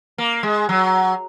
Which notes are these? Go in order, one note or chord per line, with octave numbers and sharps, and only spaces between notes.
A#3
G#3
F#3